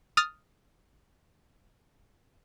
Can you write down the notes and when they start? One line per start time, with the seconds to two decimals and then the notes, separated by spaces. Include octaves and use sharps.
0.17 D#6 F6 A6